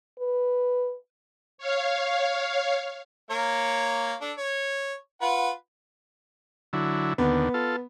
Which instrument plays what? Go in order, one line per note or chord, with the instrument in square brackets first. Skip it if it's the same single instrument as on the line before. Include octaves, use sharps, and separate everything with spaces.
[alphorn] B4
[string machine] C#5 F5
[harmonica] A#3 A#4 C#5
D4 A4
C#5
F4 B4 F#5
[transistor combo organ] D3 F#3 E4
[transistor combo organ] D#2 D3 [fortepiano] B3
[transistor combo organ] F4 A4